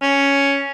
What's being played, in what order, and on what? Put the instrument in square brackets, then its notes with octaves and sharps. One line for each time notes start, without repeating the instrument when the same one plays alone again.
[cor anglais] C#4